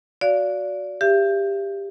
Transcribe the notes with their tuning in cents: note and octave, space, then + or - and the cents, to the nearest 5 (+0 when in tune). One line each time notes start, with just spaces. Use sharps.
F#4 -5 D5 -25 F5 +0
G4 +15 E5 +45